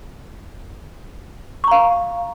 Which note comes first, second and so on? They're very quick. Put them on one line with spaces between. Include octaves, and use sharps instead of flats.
C#6 A#5 F5